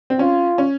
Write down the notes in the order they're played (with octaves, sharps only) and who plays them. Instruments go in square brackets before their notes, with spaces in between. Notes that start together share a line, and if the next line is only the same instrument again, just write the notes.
[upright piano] C4
[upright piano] C#4 [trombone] F4
[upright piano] C#4